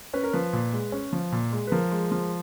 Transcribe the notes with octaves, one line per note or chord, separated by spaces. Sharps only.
C#4 B4
A#4
F3 B4
A#2
G#3
C#4
F3
A#2
G#3
B4
F3 A#4
G#3
F3